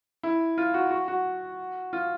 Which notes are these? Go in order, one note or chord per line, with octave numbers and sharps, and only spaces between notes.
E4
F4
F#4
F#4
F#4
F4